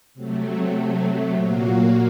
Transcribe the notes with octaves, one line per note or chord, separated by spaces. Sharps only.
C3 F#3 A3
A#2 F#3 A#3 F#4